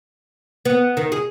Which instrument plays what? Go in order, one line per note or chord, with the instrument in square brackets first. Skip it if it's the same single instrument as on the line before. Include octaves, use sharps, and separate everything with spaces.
[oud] B3
D#3
G#4